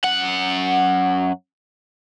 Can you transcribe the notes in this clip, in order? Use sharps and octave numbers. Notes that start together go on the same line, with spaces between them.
F#2 F#5